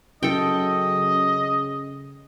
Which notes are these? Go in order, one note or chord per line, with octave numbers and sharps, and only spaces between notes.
F#2 C#3 A4 D#5 G5